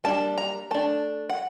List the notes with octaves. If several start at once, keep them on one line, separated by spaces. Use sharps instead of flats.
G3 A#3 D4 A5
A#5
A3 D4 A5
F#5